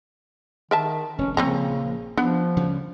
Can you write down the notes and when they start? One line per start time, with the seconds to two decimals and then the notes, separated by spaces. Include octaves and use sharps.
0.71 D#3 A#4 E5 A5
1.18 F1 C#4
1.37 A#1 C#3 F3 A#3 C4 C#4 A#5
2.17 F3 B3 D4
2.57 D2 C#3 G3